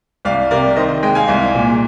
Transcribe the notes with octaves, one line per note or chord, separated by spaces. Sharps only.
C2 D5 F5
C3 A#4 D5
D#3 C5 D#5
G#3 D#5 G5
F5 G#5
C2
A#2